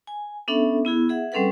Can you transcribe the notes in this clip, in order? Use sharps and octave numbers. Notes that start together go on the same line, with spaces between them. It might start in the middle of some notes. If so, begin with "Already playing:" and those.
G#5
B3 C#4 D4 A4 E5
B3 E4 G#4
G#4 E5 F#5
G3 C4 C#4 A4 B4 F#5